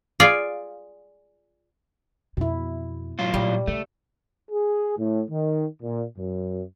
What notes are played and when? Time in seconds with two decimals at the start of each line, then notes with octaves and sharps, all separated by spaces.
0.20 F4 G#4 D5 F5
2.37 F2 B2 E4
3.19 A2 F#3 F4
3.34 A#2 G3
3.67 C#3 A3
4.51 G#4
4.98 A2
5.30 D#3
5.82 A#2
6.18 F#2